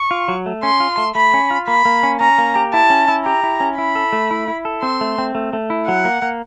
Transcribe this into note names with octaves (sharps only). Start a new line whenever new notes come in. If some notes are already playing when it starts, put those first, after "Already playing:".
Already playing: C#6
F4
F#3
A3
C#4 C6
F4
A3
A3 B5
C#4
F4
A#3 B5
A#3
C#4
C#4 A#5
A#3
G4
E4 A5
C#4
E4
G4 A#5
E4
C#4
E4 B5
A4
A3
E4
E4
A4
C4 C6
A3
C4
A3
A3
E4
F#3 F#5
A#3
A#3